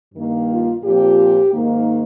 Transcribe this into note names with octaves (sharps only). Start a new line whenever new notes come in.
G2 D#3 A#3
F4
A#2 F3 C4 G4
G#2 D#3 A#3